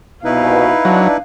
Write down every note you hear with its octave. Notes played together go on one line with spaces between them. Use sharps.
C2 B2 D#4 E4 B4 F5
F#3 D4